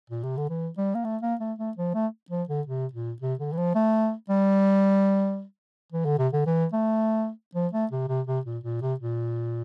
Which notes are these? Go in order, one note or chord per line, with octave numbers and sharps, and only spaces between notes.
A#2
C3
D3
E3
G3
A#3
A3
A#3
A3
A3
F3
A3
F3
D3
C3
A#2
C3
D3
E3
F3
A3
G3
E3
D3
C3
D3
E3
A3
F3
A3
C3
C3
C3
A#2
A#2
C3
A#2